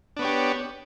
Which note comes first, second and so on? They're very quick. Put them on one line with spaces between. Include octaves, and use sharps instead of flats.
D4 B3 C#5 G4